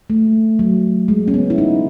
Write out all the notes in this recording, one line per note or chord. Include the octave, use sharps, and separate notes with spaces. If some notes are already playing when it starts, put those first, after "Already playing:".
A3
F#3
G#3
C#4
B3
E4
D#4